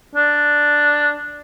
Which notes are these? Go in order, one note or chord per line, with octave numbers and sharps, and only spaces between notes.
D4